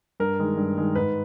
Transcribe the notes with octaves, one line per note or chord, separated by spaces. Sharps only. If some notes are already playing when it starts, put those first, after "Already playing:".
G2 A#4
D#3 G#3
G2
D#3 G#3
G#2 B4